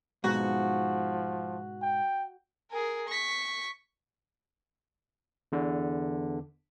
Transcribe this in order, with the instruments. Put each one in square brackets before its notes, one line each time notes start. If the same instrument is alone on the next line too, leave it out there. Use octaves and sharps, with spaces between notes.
[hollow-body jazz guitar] G#2 B2 [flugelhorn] F3 [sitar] F#4
[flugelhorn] G5
[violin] G#4 A#4
C#6 B6
[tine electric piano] E2 D3